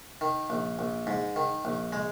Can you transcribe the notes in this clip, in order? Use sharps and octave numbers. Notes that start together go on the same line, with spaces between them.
D#3
A#1
A#1
G#2
D#3
A#1
G#3